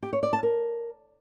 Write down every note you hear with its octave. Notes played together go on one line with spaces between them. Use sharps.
G4
C#5
D5
A5
A#4